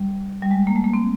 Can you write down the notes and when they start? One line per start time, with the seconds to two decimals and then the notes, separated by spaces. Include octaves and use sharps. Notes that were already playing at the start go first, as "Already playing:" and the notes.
Already playing: G3
0.42 G3
0.51 G#3
0.67 A#3
0.76 A3
0.84 A#3
0.94 C4